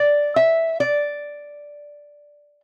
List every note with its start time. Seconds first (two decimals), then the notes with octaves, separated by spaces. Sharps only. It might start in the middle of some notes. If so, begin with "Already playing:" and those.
Already playing: D5
0.36 E5
0.80 D5